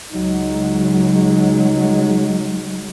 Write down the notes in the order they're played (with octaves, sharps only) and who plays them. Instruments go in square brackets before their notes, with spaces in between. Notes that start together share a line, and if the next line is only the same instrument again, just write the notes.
[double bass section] C#2 F#3 G#3 [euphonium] D#4